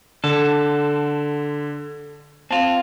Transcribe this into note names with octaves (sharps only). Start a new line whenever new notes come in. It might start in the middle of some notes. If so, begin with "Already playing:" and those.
D3 A4
C4 F4 A5